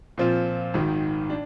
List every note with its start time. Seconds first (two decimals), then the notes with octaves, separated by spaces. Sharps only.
0.18 A#2 F3 C4 F4
0.74 G#1 G#2 D#3
1.30 D4